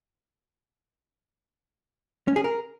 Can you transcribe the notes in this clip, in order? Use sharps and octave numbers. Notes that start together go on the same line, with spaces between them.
C#4
G#4
A#4